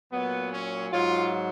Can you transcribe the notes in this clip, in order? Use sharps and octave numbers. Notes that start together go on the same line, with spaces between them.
A#2 F#3 B3
C#4
G#2 F#3 F4